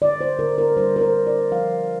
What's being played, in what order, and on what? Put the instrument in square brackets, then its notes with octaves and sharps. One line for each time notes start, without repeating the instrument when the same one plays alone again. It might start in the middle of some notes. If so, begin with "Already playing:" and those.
[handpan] D3 D5
C5
D3 A#4
A#4
G3 C5
A#4
C5
D3
D5
F3 F5